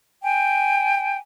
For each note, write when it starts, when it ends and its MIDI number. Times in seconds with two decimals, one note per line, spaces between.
0.23 1.18 79
0.23 1.18 80